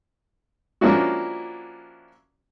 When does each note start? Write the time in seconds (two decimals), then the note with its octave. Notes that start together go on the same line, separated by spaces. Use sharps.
0.81 F3 A#3 C#4 D4 E4 F#4